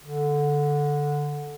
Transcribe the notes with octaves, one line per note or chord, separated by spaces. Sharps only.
D3